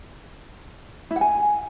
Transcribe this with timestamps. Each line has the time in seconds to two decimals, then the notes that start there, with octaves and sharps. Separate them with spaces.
1.11 E4
1.16 F#5
1.21 G#5